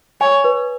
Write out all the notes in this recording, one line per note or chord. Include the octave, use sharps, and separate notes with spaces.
C#5 G#5
B4